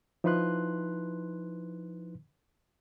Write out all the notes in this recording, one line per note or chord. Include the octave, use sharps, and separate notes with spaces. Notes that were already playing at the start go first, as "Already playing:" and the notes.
F3 D#4 E4 B4 C6 F#6